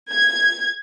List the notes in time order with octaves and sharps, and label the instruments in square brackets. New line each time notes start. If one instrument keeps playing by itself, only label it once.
[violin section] G#6